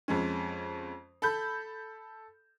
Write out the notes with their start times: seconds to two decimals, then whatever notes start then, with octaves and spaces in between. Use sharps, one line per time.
0.08 F2 G#3 C#4
1.22 A4 B5 G6